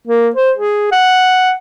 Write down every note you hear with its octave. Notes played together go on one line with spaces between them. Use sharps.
A#3
C5
G#4
F#5